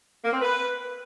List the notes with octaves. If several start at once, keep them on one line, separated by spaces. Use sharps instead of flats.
A#3
C4
B4